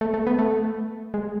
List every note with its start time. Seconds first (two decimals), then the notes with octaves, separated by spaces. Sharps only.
0.01 A3
0.14 A3
0.27 B3
0.39 A3
1.14 G#3